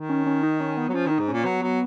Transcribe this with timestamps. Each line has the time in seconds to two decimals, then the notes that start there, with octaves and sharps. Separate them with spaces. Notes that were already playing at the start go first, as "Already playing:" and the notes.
Already playing: D#3
0.09 C#4
0.26 C#4
0.43 D#4
0.60 C#4
0.77 B3
0.89 F#3
0.94 F3 C#4
1.06 D#3 D#4
1.19 G#2
1.28 A#2 C#4
1.45 F#3 B3
1.62 F#3